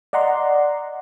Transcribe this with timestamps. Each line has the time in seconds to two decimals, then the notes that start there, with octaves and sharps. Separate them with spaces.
0.13 D5 D#5 F#5 A#5 C6